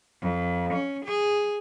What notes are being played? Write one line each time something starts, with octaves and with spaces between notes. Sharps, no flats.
F2
C#4
G#4